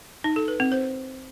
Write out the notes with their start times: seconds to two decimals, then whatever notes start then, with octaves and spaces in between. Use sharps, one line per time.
0.24 D#4
0.36 A4
0.48 B4
0.60 C4
0.72 C5